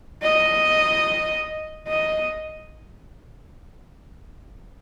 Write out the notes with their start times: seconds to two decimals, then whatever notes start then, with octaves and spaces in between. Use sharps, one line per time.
0.23 D#5
1.87 D#5